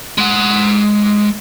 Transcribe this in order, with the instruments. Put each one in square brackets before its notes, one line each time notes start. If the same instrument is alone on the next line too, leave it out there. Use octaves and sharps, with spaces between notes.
[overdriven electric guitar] G#3 F#5